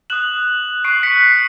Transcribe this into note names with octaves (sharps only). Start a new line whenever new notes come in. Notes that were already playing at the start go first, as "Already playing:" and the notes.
D#6 F#6 E7 F#7
C#6 F#6 C7 D7
B6 C#7
C7